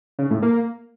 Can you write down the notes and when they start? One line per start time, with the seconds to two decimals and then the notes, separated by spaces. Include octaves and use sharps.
0.19 C#3
0.30 A2
0.42 A#3